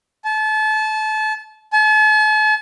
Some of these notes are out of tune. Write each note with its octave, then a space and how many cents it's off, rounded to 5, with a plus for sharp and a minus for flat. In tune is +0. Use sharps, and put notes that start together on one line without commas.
A5 -30
A5 -45